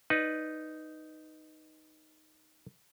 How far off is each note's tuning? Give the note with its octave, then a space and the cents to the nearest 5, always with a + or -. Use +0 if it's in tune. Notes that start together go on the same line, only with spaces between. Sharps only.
D#4 +0 B4 +0 D5 +0